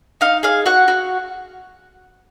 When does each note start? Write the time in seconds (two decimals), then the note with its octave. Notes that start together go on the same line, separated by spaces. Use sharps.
0.21 D#4 F5
0.43 G#4 F5
0.66 F#4 F#5
0.88 F#4